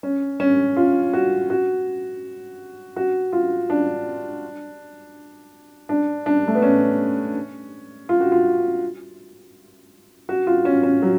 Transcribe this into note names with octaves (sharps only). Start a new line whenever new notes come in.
C#4
C#4
F4
F#4
F#4
F#4
F4
D4
D4
D4
A3
B3
C#4
F4
F#4
F4
F#4
F4
C#4
C#4
F#3